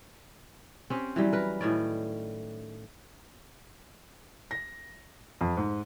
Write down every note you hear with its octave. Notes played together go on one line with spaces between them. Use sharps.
C4 C#4 G4
E3 F#3 G3
A#4 B4
A2 D#3 C#4 D5
A#6
F2
G#2